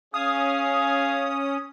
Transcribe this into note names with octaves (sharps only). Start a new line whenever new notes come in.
C#4 G#4 F5 G#5 D#6